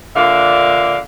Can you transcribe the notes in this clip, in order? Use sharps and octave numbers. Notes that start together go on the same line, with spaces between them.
A#2 D3 D4 E5 F5